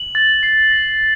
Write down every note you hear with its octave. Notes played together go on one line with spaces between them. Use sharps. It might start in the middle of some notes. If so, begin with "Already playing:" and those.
Already playing: F#7
A6
C7
A#6